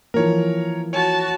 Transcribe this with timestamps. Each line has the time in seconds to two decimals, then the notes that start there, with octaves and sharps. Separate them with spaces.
0.14 E3 F3 A#3 A#4 C#5
0.93 F#4 C#5 A5